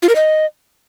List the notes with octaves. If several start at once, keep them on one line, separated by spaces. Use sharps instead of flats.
F4
A#4
D#5